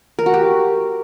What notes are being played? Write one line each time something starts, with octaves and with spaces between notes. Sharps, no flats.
A#4
F#4
G4